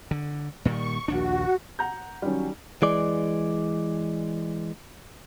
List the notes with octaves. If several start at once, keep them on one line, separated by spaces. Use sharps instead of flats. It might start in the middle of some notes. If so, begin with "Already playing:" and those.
D3
A#2 D#3 G3 C#6
A#1 D#2 D4 F#4
F#5 A#5 G6
D#3 F#3 G3 C#4
E3 G#3 D5